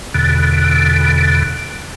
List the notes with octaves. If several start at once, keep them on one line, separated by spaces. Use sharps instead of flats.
E2 B2 D3